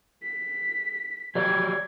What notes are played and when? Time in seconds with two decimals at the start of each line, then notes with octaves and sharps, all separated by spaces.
0.23 B6
1.35 F#3 G4 D5 G#6